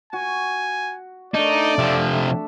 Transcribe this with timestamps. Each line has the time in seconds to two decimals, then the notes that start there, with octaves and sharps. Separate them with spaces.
0.13 F#4 G#5
1.34 A3 D4 D#4 D5
1.78 C3 F3 E5